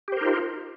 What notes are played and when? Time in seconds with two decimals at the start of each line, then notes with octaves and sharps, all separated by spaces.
0.08 G4
0.12 C5
0.17 A#4
0.21 D#4
0.25 F4